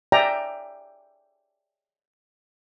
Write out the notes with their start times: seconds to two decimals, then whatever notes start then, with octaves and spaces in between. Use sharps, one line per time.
0.12 D5 E5 G5 G#5 A#5